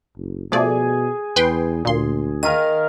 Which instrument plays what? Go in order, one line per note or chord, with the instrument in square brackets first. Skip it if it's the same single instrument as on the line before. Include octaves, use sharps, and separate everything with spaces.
[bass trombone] F#1
[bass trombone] B2 [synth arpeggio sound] F3 A3 D5 [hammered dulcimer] G#4
[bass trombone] E2 [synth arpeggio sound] B4 G5 C6
[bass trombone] D2 [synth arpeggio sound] A#2 C6
[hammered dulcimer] D#3 A#4 F5 [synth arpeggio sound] D#7